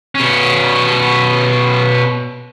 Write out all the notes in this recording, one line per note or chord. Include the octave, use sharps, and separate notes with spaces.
B2 C#4